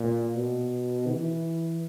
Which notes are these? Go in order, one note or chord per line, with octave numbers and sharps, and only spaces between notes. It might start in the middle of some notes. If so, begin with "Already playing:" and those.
Already playing: A#2
B2
E3